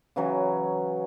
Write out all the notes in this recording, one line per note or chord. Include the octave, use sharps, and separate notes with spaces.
C#3 E3 F#3 C#4